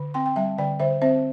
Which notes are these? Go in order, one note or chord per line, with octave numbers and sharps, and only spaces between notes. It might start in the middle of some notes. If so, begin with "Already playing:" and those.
Already playing: D3
C4 G5 C6
G5
G3 E5 A5
D3 D5 G5
D3 C5 E5
C4 C5 E5